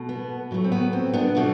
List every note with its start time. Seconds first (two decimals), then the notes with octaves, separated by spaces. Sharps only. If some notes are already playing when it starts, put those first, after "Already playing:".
Already playing: B2 A3
0.09 B3
0.51 A2 F#3 A3
0.64 C4
0.72 B3
0.93 C4
1.14 B3 D4
1.35 B2 A3 D4 F#4